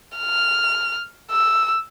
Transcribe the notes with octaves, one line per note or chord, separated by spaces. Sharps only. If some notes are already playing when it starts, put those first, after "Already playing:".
F6
E6